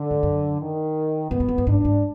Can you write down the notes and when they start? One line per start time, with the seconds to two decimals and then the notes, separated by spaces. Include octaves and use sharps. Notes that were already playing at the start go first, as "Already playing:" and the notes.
Already playing: D3
0.11 G#2
0.23 F#2
0.59 D#3
1.31 G#2 B3
1.40 F#2
1.49 F2
1.58 F#2
1.67 G#2 D4
1.85 G#2